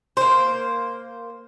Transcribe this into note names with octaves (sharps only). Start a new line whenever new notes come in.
A#3 C5